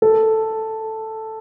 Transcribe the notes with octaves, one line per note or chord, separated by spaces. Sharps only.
A4